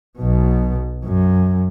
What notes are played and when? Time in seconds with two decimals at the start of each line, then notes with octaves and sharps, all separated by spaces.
0.19 B1 B2
1.05 F#2